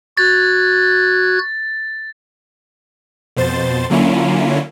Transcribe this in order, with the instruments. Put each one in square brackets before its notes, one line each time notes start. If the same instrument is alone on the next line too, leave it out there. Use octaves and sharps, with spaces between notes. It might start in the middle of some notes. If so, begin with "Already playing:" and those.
[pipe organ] F#4 F#6 G#6 [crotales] A6
[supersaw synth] F2 B2 C5 A6
D3 F#3 A#3 C#4 E4 F4